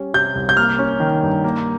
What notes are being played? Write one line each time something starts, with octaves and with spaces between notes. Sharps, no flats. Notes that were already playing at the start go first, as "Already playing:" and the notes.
Already playing: G3 C#4
C3 G6
C2
G6
A#3 F6
C#4
D#3
G2
A#3